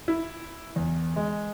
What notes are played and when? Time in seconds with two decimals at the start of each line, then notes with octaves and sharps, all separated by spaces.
0.08 E4
0.76 E2
1.16 G#3